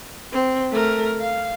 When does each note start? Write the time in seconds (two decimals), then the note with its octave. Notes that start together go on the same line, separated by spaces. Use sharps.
0.33 C4
0.72 A3 A#4
1.20 F5